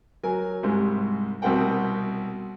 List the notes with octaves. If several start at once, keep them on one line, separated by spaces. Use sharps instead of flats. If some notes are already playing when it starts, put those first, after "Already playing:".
F#3 A#4 G#5
C2 G#2 C3
C2 B2 C4 A#4 F#5 G5